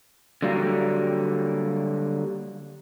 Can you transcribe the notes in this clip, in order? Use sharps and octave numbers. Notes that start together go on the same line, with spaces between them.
D3 F#3 G3 A#3